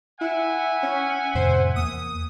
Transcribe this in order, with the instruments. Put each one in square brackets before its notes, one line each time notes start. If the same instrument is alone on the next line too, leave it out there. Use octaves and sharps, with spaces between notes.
[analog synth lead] E4 [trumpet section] E5 F#5 G#5
[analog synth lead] C#4
[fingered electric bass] F2 A2 C3 [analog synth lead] C5
[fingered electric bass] E2 A#3 [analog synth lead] D#6